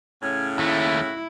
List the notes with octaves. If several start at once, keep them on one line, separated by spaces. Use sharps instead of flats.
A2 C#3 C#4 G#5
D#2 A3 E4 F#4